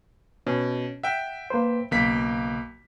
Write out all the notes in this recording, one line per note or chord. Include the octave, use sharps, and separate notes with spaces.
B2 C#4
E5 F#5 G5
A#3 B4 C5
B1 C#3 A#3 B6